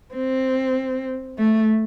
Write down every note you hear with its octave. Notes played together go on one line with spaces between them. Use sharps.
C4
A3